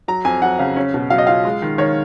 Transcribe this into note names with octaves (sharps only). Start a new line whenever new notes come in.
F#3 A#5
F2 G#5
F#3 F#5
C#3 F5
C#4
B2
F#3 F5
D#5
F4 F5
G#3
D#3
D#3 C#5